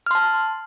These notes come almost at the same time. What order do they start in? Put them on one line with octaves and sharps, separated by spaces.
F6 C6 A5